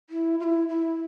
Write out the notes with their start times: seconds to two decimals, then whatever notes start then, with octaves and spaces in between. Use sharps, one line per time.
0.10 E4
0.40 F4
0.44 E4
0.69 E4